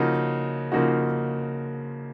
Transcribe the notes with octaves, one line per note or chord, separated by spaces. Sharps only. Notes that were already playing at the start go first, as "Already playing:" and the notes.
Already playing: C#3 F3 A#3 D#4 F#4
C#3 F3 A#3 D#4 F#4